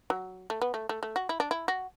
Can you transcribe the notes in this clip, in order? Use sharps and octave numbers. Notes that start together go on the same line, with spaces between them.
F#3
A3
B3
A3
A3
A3
F#4
E4
D4
E4
F#4